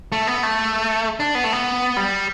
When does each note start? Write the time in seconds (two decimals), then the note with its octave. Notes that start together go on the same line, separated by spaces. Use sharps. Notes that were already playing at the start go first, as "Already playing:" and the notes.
0.12 A3
0.27 B3
0.43 A3
1.20 D4
1.35 B3
1.44 A3
1.53 B3
1.97 G3